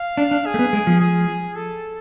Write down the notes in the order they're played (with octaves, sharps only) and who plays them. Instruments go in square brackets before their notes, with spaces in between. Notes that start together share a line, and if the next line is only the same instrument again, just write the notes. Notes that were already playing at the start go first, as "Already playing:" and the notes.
Already playing: [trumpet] F5
[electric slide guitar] D4
D4
[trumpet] G#4
[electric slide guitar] A3
B3
G#3
F3
[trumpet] G#4
A4